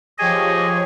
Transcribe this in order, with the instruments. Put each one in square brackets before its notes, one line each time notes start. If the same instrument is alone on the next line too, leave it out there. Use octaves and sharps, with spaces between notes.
[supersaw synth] F3 G4 C#5 [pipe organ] G#4 D#5 G#5